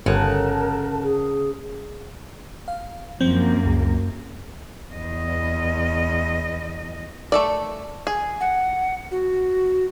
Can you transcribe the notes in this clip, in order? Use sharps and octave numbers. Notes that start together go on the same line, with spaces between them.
G1 C#3 A4 A#4 F#5 A5
G#4
F5
F#2 F3 A#3 C4
C#2
E2 D#5
A3 A4 D5
G#4
F#5
F#4